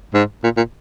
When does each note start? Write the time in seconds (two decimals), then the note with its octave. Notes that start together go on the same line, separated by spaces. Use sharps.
0.14 G#2
0.44 A#2
0.57 A#2